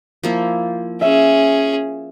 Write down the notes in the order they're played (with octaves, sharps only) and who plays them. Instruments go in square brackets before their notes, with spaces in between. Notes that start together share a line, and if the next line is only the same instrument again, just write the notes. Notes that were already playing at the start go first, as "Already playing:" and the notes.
[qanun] F3 A#3 E4
[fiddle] C#4 G#4 [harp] E5